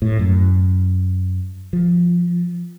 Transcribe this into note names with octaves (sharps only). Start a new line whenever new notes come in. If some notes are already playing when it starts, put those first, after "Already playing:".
A2
F#2
F3